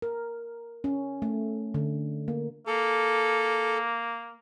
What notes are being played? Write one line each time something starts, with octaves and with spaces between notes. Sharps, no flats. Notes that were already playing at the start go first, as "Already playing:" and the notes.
A#4
C#4
A3
D3
A#3
A#3 A4